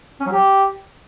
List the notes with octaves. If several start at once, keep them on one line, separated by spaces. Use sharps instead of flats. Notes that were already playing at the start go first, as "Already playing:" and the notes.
C#4
F#3
G4